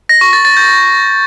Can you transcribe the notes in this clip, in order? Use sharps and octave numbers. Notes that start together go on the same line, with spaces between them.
A#6
C#6
A6
A6
G6